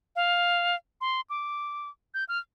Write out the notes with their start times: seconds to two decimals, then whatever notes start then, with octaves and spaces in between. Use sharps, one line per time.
0.16 F5
1.01 C6
1.30 D6
2.14 G6
2.29 F6